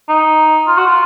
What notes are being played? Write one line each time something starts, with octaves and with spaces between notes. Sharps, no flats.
D#4
F4
F#4
F4